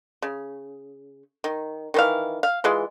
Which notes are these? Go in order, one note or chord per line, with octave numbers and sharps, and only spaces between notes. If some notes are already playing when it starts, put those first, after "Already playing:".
C#3
D#3
D#3 E3 F5
F5
E3 G#3 F4